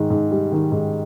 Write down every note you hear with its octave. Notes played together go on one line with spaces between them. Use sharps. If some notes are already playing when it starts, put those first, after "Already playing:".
Already playing: G#2 D#3
G#2
G3
D#3
G#2